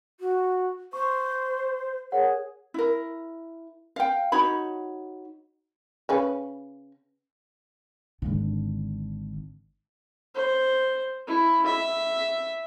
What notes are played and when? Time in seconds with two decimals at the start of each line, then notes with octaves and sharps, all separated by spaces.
0.20 F#4
0.93 C5 C#6
2.12 G#4 A#4 C#5 F#5
2.74 E4 A#4
3.96 F5 G5
4.32 D#4 F#4 C#5 B5
6.09 C#3 C#4 B4
8.22 G#1 D3
10.35 C5
11.28 E4
11.66 E5